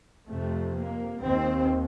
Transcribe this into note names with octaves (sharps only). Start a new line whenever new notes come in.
F2 C3 A3
A#3
D#2 C4